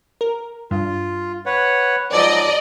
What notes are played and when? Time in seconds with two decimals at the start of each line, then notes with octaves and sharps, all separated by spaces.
0.21 A#4
0.71 G2 F4
1.46 B4 C#5 F#5
2.13 G#2 F3 F#3 D5 D#5